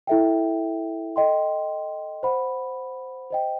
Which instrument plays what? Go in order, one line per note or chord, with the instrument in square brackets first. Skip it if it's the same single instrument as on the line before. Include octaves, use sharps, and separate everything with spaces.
[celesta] E4 A4 E5 G5
A4 D#5 G5 C6
C5 F#5 B5
C5 D#5 G5